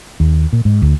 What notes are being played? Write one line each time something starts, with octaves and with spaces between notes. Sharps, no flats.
D#2
A#2
G#2
D2